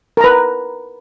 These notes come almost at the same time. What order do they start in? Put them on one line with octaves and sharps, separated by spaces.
A#4 A#5 B4